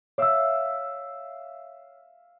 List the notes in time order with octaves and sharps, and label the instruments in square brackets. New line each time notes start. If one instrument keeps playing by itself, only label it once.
[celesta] C#5 E6 [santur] E5 F5 D6